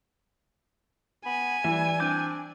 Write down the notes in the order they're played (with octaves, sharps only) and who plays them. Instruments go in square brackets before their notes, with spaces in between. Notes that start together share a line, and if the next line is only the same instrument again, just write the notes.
[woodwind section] B3 B5 [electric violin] G#5
[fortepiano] E3 [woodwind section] G3 [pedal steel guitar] E5
[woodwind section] C4 D4 [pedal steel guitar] D6 G6